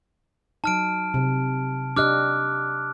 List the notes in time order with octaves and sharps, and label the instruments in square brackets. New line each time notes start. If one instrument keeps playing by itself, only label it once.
[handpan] F#3 D#4 [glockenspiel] A5 F6 D7
[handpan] C3
[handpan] D4 G4 D#5 [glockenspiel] D6 F6 F#6